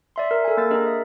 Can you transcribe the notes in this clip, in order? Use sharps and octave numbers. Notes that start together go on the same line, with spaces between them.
D5 E5 C6
A#4
A4 G#5
A#3 A#4 A6
D4 G#4 A#4 D#5
E5